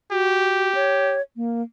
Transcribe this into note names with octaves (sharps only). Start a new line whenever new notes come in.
F#4 G4
C#5
A#3